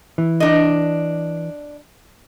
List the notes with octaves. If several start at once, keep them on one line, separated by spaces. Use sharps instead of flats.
E3
D4 D#5